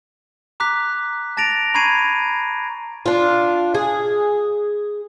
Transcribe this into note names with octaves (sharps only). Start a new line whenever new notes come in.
A#5 D6 F#6 B6
A5 A6 A#6 D7 F7
A#5 B5 C#6 G#6 C7 D#7
D4 F4
G#4